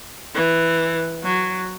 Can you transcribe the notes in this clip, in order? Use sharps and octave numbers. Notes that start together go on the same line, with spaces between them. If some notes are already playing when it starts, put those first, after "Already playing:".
E3
F#3